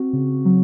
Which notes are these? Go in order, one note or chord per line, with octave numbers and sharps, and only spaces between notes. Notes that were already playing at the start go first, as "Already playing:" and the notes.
Already playing: C4 F#4
C#3
F#3